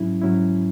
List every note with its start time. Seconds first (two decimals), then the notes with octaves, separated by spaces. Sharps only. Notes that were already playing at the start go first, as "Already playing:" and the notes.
Already playing: G#2 F#3 C#4 E4
0.22 G#2 F#3 C#4 E4